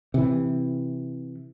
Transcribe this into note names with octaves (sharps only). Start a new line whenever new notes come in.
C3 E3